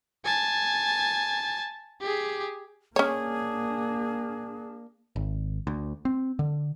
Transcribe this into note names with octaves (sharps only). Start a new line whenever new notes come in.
G#5 A5
G4 G#4
A#3 C#4 D4 G#4 C#5
G#1
D2
C4
D3